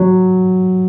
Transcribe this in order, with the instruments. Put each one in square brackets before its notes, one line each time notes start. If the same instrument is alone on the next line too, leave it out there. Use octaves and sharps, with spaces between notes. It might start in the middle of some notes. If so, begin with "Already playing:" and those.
Already playing: [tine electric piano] F#3